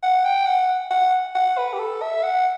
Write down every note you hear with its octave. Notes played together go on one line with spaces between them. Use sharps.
F#5
G5
F#5
F#5
F#5
B4
G4
A4
E5
F#5